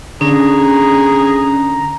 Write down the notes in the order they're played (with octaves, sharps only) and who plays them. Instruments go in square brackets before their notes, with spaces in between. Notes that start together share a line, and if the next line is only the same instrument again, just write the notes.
[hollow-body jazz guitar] D3 [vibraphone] C#4 [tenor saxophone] G#4 [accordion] A#5